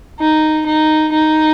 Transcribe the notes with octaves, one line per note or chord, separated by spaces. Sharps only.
D#4
D#4
D#4